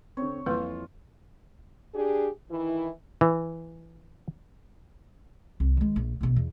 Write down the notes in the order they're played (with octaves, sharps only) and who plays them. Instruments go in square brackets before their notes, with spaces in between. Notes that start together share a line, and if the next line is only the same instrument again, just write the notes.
[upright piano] D3 C4 [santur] C#5
[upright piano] F2 E3 [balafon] G3 A#3 B4 [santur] F4
[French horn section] D4 G4 G#4
D#3 E3 E4
[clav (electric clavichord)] E3
[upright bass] C2
D#3 G#3
A#1
A#1 B2
E2